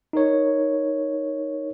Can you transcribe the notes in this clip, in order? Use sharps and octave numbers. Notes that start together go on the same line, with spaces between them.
D#4 A#4 C#5